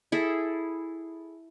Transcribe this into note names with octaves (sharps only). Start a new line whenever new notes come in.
E4 G#4 A4